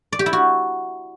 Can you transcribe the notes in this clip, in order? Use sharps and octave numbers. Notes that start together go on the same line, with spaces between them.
D5
G4
E4
F#4